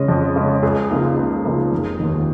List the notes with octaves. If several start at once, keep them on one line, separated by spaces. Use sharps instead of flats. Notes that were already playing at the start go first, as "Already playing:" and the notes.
Already playing: C#3 G#3 C#4 D#5
F2
C#3 G#3 C#4
C#2 G#4
C#3 F3 A#3 D#4
C#2
C#3 F3 A#3 D#4
F1
D#2 D#3